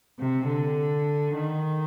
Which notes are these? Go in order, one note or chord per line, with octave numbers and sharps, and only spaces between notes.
C3
D3
D#3